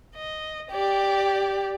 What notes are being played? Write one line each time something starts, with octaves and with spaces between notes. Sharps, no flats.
D#5
G4 D5